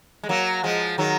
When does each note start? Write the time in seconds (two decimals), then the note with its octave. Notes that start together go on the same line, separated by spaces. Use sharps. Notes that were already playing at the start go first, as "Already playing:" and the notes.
0.23 G#3
0.29 F#3 A#3
0.64 F3 G#3
0.98 D#3 F#3